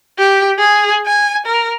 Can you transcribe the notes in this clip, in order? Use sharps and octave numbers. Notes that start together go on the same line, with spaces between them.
G4
G#4
G#5
A#4